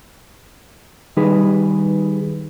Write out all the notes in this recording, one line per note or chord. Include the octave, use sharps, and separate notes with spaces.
D#3 G3 D#4 G#4 B4